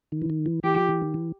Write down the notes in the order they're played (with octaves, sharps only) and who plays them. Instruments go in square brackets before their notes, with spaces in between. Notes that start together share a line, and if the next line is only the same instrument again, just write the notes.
[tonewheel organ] D#3
E3
D#3
E3
[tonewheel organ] E3 [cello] G4
[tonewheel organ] F3
E3
D#3
E3